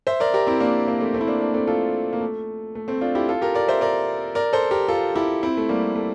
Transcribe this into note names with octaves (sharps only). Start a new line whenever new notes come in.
C5 E5
A#4 D5
G4 A#4
C4 E4
A#3 D4
A#3 D4
A3 C4
A3 C4
E4
A#3 D4
A#3 D4
A3 C4
F4 A4
A#3
A3
A3
A3 C4
D4 F4
E4 G4
F4 A4
G4 A#4
A#4 D5
C5 E5
A#4 D5
A#4 D5
A4 C5
G4 A#4
F4 A4
E4 G4
C4 E4
A3
G3 A#3
A3